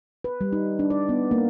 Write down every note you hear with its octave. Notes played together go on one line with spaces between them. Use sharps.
B4
G3
D#4
D4
D5
B3
A#3